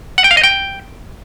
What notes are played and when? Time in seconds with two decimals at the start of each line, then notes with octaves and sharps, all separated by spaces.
0.18 F#5
0.24 G5
0.31 F5
0.37 D#5
0.44 G5